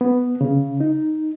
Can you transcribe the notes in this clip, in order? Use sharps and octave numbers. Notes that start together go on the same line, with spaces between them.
B3
C#3
D#4